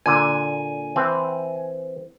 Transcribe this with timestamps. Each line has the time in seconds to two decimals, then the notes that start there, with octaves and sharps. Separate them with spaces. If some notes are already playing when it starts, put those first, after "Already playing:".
0.06 A#2 D3 G#5
0.96 E3 C4